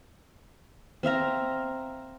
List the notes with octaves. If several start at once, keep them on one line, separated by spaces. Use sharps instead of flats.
C4 E5 F5 A#5